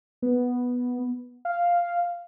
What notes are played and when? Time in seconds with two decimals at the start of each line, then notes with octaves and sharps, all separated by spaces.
0.22 B3
1.45 F5